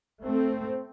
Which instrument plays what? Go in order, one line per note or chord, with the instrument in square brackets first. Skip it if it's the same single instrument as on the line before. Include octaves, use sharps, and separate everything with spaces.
[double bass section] A3 C4